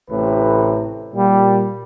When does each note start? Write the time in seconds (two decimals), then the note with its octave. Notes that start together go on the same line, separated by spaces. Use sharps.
0.10 A1 A2 C3 B4
1.14 A#2 G3